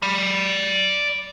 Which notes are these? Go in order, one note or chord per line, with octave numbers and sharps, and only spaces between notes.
D5 B5